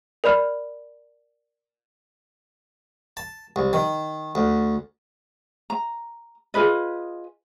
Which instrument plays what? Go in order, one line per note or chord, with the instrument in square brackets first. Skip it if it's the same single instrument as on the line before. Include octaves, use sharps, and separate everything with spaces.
[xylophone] A#4 D5 B5 F6
[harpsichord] A5
C2
D#3
D2
[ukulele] A#5
F4 G#4 B4 D#5